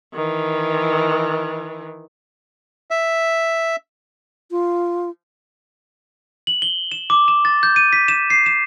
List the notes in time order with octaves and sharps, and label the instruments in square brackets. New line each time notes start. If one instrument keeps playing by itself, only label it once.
[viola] D#3 E3
[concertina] E5
[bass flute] F4
[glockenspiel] F#7
G7
E7
D6
E7
A6
G6
D#7
B6
E7
C7
E7